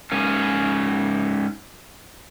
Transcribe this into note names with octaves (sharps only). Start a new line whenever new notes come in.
G#2 A#3 C#4